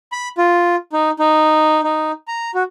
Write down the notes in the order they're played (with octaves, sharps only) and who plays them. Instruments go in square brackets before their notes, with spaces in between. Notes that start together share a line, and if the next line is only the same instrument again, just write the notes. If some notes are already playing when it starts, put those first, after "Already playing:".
[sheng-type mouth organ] B5
F4
D#4
D#4
D#4
A#5
F#4